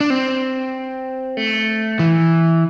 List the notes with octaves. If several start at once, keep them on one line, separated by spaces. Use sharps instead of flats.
D4
C4
A3
E3